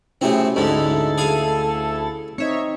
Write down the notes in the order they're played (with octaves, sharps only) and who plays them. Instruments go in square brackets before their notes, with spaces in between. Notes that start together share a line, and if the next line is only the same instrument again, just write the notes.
[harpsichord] A2 C3 C4 [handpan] C#4 E4 F#4 [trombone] G#4
[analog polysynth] D2 E4 A6 [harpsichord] G#2 D3 [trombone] A4 [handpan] D#5
[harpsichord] G#4 F5 G#5
[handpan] C4 D#4 D#5 [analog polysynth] C#5 E5